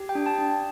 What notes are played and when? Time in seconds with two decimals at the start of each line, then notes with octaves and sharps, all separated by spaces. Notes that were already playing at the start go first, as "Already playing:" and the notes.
Already playing: G4
0.09 G5
0.15 D4
0.26 A5
0.38 D4